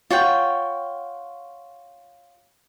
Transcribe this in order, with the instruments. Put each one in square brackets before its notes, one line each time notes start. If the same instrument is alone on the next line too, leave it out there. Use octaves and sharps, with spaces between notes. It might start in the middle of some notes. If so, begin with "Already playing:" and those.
[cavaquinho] F4 C#5 F#5 G5